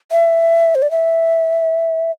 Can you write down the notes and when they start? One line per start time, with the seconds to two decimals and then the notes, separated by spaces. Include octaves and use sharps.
0.12 E5
0.75 C5
0.82 D5
0.91 E5